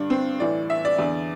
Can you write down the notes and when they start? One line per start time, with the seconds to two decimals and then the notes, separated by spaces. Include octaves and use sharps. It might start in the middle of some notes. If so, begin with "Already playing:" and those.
Already playing: G2 D3 D4
0.10 C4
0.40 A2 E3 D5
0.70 E5
0.85 D5
0.99 E2 D3